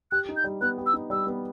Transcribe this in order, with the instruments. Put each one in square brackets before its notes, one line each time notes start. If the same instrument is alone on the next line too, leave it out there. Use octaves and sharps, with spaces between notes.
[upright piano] G4 [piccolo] F#6
[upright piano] D#4
[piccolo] G6
[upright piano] G3
[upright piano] B3 [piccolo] F#6
[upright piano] G4
[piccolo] E6
[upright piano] D#4
[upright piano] G3 [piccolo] E6
[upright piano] B3